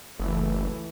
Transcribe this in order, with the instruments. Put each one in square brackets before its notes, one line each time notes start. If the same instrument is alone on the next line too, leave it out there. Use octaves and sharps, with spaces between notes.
[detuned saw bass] F#1 [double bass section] C#2 E3 A3